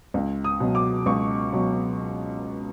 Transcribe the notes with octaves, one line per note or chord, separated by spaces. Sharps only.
C#2
D#6
B2 F#3
D6
C#2 C#6
B2 F#3